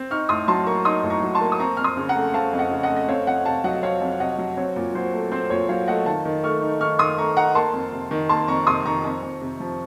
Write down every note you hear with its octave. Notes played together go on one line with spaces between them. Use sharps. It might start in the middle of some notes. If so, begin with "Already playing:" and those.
Already playing: C4
D#4 C#6 F6
A2 C6 D#6
F#3 A5 C6
A#3 A#5 C#6
D#4 C6 D#6
A2
A#5 C#6
F#3
A5 C6
A#3
D#6
C4 A#5 C#6
F2 F6
C6 D#6
C#3
F#5 A#5
A3
C4 F5 A5
F2
D#5 F#5
C#3
D#5 F#5
A3
D#5
C4 C#5 F5
F2 D#5 F#5
C3 F5 A5
F#3 D#5 F#5
C4 C#5 F5
F2
C3 D#5 F#5
F#3
C4 C#5
A#2
F#3 C5
A3
C4 C5
A#2 C#5
F#3 C#5 F5
A3 D#5 F#5
D#3 F5 A5
D#3
A3 C#6 F6
D#4
D#3 C#6 F6
D#3 C6 D#6
A3 A#5 C#6
D#4 F#5 A#5
A#3 A5 C6
F2
C3
D#3
A#3 A5 C6
F2 A#5 C#6
C3 C6 D#6
D#3 A#5 C#6
F2
F2
C3
F3